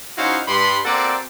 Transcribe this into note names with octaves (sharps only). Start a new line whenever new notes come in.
C#4 D#4 E4 F#4 C5 F5
G2 B5 C6
A#3 C4 F#4 A4 D5